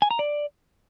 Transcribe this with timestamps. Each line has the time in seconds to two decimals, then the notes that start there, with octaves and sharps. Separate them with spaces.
0.02 G#5
0.11 A#5
0.19 D5